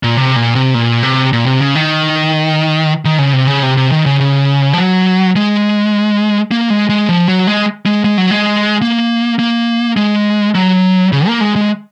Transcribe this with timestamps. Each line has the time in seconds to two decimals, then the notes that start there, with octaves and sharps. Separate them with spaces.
0.03 A#2
0.17 C3
0.36 A#2
0.55 C3
0.74 A#2
1.03 C3
1.33 A#2
1.46 C3
1.61 C#3
1.75 D#3
3.05 D#3
3.19 C#3
3.33 C3
3.47 C#3
3.63 C3
3.77 C3
3.92 D#3
4.06 C#3
4.20 C#3
4.73 F3
4.78 F#3
5.36 G#3
6.51 A#3
6.70 G#3
6.89 G#3
7.09 F3
7.28 F#3
7.47 G#3
7.86 G#3
8.05 G#3
8.18 F#3
8.31 G#3
8.82 A#3
9.39 A#3
9.97 G#3
10.55 F#3
11.12 C#3
11.27 A#3
11.41 G#3
11.56 G#3